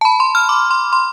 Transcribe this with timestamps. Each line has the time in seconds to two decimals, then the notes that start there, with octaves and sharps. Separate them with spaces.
0.01 A5
0.05 B5
0.20 C6
0.35 F6
0.49 D6
0.71 C6
0.93 C6